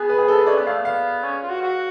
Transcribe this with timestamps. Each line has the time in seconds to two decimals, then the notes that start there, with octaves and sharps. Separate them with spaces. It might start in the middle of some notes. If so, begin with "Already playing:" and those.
Already playing: B3 G#4
0.09 B4
0.18 G#4
0.28 A4
0.38 B4
0.47 C#4 D5
0.58 B3
0.67 A3 F5
0.78 B3
0.85 F5
1.24 C#4
1.43 F4
1.49 F#4
1.61 F#4